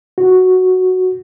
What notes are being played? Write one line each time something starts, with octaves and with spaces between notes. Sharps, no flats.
F#4